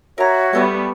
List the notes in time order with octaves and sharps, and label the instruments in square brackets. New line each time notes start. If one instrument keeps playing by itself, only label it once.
[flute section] F#4 C#5 E5 [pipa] A#4 A#5
[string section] G3 B3 [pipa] A3 A4 B4